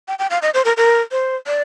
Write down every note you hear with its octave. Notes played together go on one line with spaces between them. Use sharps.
G5
G5
F5
D#5
C5
A#4
A#4
C5
D5